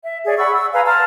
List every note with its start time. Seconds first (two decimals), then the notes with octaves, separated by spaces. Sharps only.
0.05 E5
0.26 G#4 C#5 D5
0.38 F#5 B5 C#6 E6
0.54 E6
0.73 B4 F5 G#5 A#5
0.86 A5 A#5 C6 F6